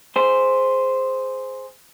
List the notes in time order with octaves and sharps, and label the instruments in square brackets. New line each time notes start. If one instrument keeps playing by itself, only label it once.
[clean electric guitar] G#4 C5